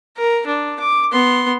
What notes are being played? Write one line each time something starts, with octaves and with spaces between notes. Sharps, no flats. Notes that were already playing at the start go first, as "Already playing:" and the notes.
A#4
D4
D6
B3 C6